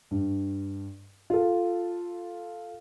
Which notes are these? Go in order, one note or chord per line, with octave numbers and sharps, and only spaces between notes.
G2
F4 A4